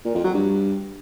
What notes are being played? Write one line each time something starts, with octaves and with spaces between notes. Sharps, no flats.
A#2
F2
F#3
G2